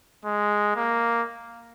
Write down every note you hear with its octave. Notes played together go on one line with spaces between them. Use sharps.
G#3
A#3